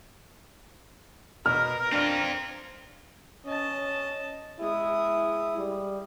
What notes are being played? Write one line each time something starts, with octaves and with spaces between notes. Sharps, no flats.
B2 A#4 F6
C4 D4 F4
C#4 D#5 A5
G#3 E4 D#6
G3